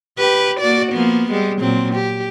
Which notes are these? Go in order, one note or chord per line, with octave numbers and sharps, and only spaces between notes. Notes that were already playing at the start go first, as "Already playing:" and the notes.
G4 B4
A#3 F#4 D5
F3 A#3 B3
G3 G#3
A#2 F#3 C4
G4